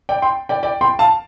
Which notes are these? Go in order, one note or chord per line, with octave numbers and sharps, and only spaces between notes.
D5 G5
G5 C6
D5 G5
D5 G5
G5 C6
F5 A5